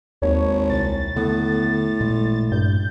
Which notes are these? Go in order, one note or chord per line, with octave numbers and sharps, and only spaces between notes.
G#1 D#2 C#5
C2 A6
A2 D3 B3
A1 A#2 G#3
G2 G6